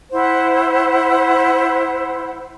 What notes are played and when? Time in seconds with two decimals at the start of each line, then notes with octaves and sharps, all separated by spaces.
0.12 E4 C5 F#5